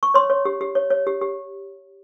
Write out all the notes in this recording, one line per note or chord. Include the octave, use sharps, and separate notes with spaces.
C#6
C#5 C6
C#5
G4
G4
C#5
C#5
G4
G4